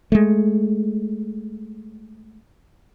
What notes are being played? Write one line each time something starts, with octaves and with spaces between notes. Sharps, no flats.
G#3 A3